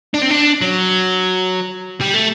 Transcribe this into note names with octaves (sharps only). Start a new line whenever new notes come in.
D4
C4
D4
F#3
G3
A3